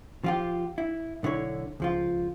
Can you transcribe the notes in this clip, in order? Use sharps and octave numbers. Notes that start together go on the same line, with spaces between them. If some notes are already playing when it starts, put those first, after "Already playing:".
F3 F4 G4
E4
B1 D3 E4 C#5
C#2 F3 F4